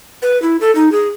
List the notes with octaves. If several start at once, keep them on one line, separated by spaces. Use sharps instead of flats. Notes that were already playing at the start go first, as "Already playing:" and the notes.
B4
E4
A4
D#4
G#4